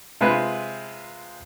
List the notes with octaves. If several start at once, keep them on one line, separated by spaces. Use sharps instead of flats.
C3 G#3 C4 F4 B4